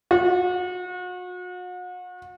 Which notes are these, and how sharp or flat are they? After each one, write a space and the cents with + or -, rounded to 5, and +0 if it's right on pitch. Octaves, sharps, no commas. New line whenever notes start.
F#4 -40